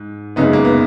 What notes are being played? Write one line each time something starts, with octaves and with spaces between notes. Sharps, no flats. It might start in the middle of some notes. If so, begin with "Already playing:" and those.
Already playing: G#2
F#1 F#2 C#3 G#3 B3 D#4
A#3
B3